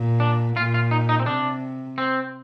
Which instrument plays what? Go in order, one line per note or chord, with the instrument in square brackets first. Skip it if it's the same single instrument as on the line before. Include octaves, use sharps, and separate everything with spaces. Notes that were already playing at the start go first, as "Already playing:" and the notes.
Already playing: [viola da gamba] A#2
[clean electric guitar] D4
[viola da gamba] A#2 [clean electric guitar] F4
[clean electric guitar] F4
D#4
D#4
C4
[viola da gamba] C3 [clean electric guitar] D4
[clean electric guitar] C4